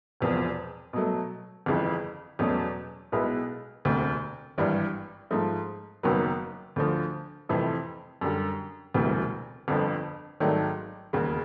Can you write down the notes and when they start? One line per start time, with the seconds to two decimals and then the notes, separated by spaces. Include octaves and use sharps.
0.21 E1 E2 C3 F3
0.93 B2 F#3 A3
1.66 G1 F2 C#3 E3
2.39 E2 B2 F#3 A3 C#4
3.12 B1 B2 G#3 B3 E4
3.85 E1 D2 C3
4.58 G#1 G2 E3 G3
5.31 G#2 F3 A3
6.03 F#1 F#2 D#3 F#3 B3
6.76 D2 D3 F3
7.49 F2 C3 E3 A3
8.21 F#2 D3 G3
8.94 E1 D2 C3 E3 G3
9.68 G1 F2 D3 F3
10.40 G#1 G#2 D#3 F#3 A3
11.13 E1 D#2 C#3